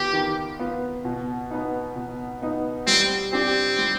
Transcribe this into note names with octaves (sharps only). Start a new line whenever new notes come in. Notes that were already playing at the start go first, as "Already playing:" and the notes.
Already playing: D#3 B3 F4 G4
D#3
B3 F4
B2
B3 D#4
B2
B3 D#4
G3 C4
C4 D4 G4
G3